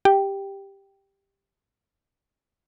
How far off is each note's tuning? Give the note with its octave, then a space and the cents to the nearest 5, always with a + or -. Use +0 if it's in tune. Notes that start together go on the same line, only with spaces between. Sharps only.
G4 +5 G5 +0